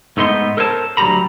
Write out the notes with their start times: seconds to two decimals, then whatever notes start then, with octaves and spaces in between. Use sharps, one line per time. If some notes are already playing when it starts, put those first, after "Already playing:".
0.17 G#2 A3 B3 D#4 C6
0.57 A4 A#4 C5 C#5 G5 A5
0.97 D2 F#3 G3 G4 A#5 B5